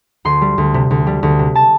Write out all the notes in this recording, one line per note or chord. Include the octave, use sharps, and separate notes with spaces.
D2 C6
G3
D2
C3
D2
G3
D2
C3
A5